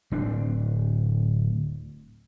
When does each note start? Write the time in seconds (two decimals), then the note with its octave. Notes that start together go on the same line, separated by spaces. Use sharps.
0.11 D1 C4 D4